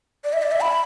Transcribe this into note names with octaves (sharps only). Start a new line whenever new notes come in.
D5
E5
D5
E5
B5